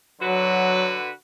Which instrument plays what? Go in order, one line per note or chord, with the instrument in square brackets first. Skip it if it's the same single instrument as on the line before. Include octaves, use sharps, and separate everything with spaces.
[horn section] D3 F#4 B4 [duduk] F#3